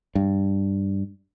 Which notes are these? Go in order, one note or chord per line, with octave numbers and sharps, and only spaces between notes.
G2